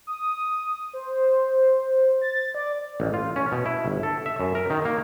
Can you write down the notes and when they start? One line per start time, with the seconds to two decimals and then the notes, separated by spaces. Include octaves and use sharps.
0.07 D#6
0.93 C5
2.21 A6
2.55 D5
3.00 A1
3.14 F4
3.36 C#4
3.52 B2
3.66 E4
3.86 G1
4.03 A4
4.26 E5
4.40 F#2
4.55 A#4
4.70 D#3
4.85 A#3